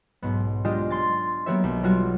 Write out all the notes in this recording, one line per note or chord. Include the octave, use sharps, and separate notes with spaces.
B1 G#2 B3
G#3 D4 F4 G4 D#5
G#3 C6 A6
F#3 A#3 B3 G4 C#5 E5
B1
F#3 G3 B3 F4 F#4